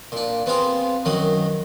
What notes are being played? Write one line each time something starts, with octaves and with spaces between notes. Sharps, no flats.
A#2 D4
B3 C4 F4 G#4
F#2 D#3 F#3 D#6